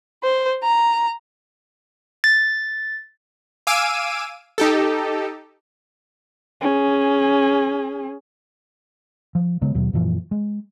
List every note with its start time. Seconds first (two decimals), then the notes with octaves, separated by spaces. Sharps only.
0.23 C5
0.64 A#5
2.24 A6
3.67 F5 G#5 D6 E6 D7 D#7
4.58 D#4 G4 A4
6.61 C#4 G#4
9.35 F3
9.62 C#3 G#3 B3
9.75 D#2 B2 F#3
9.93 F#2 A#2 E3 F3
10.31 G#3